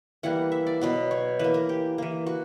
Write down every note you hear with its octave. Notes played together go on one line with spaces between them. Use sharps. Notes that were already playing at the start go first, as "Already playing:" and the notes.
E3 G3 A#3 F#5
E5
D5
B2 F#3 B3
C#5
E3 A#3 B4
A#4
G4
E3 A#3
F#4